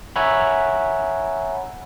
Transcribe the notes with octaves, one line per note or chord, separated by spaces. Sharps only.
C#5 E5 F#5 G#5 A#5 B5